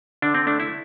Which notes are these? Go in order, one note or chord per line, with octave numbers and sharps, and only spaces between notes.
D3 D4
C4
A3 D4
E4